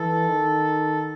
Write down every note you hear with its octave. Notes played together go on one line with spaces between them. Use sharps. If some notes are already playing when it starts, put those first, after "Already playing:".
Already playing: E3 A4
D#3